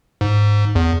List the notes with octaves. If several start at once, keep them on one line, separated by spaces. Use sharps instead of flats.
G#2
E2